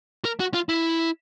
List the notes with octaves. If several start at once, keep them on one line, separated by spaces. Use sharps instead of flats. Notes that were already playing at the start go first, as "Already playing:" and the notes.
A#4
F#4
F4
E4